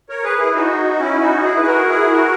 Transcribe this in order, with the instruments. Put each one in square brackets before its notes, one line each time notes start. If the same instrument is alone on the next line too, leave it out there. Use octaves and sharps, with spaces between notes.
[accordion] A#4 C#5
G#4 B4
E4 G#4
D#4 F#4
C#4 E4
D#4 F#4
E4 G#4
B4
F#4 A#4
E4 G#4
F#4 A#4